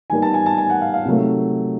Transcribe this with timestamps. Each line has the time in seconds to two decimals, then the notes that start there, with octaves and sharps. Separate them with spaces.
0.10 D#3 G3 B3 G#5
0.22 A5
0.34 G#5
0.46 A5
0.58 G#5
0.70 F#5
0.81 F5
0.94 F5
1.05 C3 D#3 F#3 A3